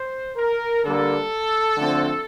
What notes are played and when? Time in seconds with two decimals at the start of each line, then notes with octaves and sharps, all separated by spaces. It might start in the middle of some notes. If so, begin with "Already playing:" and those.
Already playing: C5
0.36 A#4
0.83 D3 G3 A#3 A4
1.77 D3 F3 A3 C4